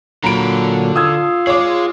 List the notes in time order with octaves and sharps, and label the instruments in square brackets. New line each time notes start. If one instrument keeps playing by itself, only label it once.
[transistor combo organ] A#2 F#3 [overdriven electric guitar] D3 B5 [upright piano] A#5 D7
[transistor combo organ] F4 [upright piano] D#6 E6 G#6
[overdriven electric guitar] G#4 D#5 [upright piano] C#5 D6